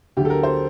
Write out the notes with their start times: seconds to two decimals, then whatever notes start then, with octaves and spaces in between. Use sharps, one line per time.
0.17 D2 D3 F#3 G4
0.25 A4
0.30 A#4
0.43 C5